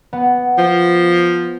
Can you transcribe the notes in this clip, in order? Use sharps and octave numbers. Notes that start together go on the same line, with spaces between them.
B3
F3